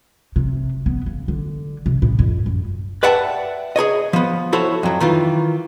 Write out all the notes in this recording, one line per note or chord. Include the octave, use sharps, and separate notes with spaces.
C3
B3
C#3
D3
C3
A2
F2
F#2
B4 D5 E5 F#5 G5 A5
G#4 A#4 C#5 D#5
F3 B3
E4 F#4 A4 C5 C#5
F2 F#3
D#3 E3 F4